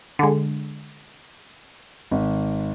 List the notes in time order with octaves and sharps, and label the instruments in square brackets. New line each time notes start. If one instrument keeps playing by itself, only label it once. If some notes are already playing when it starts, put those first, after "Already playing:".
[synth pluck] D3 G#3
[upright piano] G#1